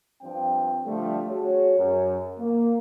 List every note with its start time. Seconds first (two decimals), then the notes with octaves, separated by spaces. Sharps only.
0.22 G2 F3 C4 G5
0.86 D3 F3 G3 A3
1.30 F#4 G#4 C#5
1.78 F#2
2.39 A#3